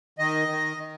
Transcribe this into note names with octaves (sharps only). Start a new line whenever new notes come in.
D#3 D#5
D#3
D#3